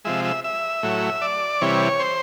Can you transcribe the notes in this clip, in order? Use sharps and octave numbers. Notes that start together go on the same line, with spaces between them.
C3 F3 G#3 E5
E5
E5
A2 F#3
D5
C3 E3 G3 C#5
C5